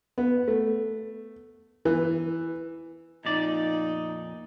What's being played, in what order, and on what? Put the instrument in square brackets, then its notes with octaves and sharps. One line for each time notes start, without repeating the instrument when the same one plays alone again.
[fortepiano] B3
A3
E3
[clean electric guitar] F2 A#2 D5 [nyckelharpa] D#4